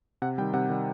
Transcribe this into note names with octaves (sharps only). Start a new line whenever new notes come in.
C3 F#5
D#3 G3 G5
C3 F#5
D#3 G3